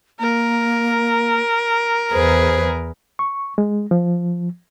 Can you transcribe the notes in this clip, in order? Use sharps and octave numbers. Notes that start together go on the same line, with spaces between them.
A#3 A#4
E2 G#4 B4 C5
C#6
G#3
F3